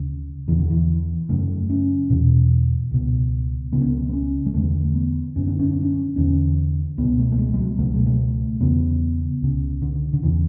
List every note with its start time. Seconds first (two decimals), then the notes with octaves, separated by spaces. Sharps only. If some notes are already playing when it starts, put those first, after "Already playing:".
Already playing: D2 C#3
0.48 E2 D3 E3
0.59 D3
0.70 E3
1.29 F#2 C#3 A3
1.70 C#4
2.10 E2 B2
2.91 C#2 B2
3.73 C#2 C#3 B3
3.81 C#4
3.88 B3
4.09 B3
4.13 C#4
4.46 G#3
4.54 E2 D3 A3
4.94 B3
5.36 F#2 D3 C#4
5.48 D4
5.59 C#4
5.70 D4
5.82 C#4
6.16 E2 D3 C#4
6.98 C#2 B2 B3
7.19 A3
7.32 A3
7.38 G#3
7.54 G#3
7.59 F#3
7.79 C#2 B2 A3
7.94 G#3
8.06 A3
8.60 E2 C#3 B3
9.42 C#2 C#3
9.82 D3
10.13 D3
10.22 E2 C#3 E3